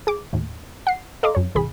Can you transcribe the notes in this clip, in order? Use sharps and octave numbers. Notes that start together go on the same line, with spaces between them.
G#4 D6
D#2 A2
F#5 C7
A4 D#5 F5 A#5 C6 D6
F#2 C#5
G#1 E2 C3 G#4 B5